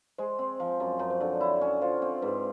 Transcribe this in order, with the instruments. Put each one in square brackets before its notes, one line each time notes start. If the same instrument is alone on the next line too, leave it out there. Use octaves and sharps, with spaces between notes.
[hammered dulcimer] G#3 [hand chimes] C5
[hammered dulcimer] C4
F3
F#2
[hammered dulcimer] F#2 [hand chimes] C#5
[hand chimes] C5
[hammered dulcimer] D3 [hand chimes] C#5
[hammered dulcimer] E4
C#4
[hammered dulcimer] F4 [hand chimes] C5
[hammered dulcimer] C4
[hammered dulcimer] G#2 [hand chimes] B4